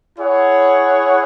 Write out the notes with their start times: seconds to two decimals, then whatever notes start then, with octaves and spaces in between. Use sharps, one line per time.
0.17 E4 G#4 C#5 F#5